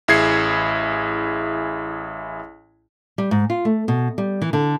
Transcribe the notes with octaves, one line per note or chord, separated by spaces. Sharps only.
A1 E4 G#4 G#6 C7 C#7
G3
G#2
F4
A3
B2
G3
E3
D3